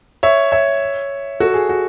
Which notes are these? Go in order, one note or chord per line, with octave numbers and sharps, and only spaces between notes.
C#5 E5
C#5 E5
F#4 A4
G#4
F#4